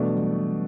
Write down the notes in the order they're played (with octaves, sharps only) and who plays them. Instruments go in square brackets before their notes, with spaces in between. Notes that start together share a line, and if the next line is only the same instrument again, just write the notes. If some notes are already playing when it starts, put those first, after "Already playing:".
Already playing: [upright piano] B2 A3 D4 [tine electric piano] E3 G3
[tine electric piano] F#3
E3 G3